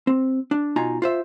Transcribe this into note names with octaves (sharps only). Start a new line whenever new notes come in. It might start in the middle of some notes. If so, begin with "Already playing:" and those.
C4
D4
B2 D#4 F4 G#5 A#5
F4 C5 E5